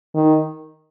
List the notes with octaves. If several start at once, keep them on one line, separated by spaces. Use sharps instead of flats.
D#3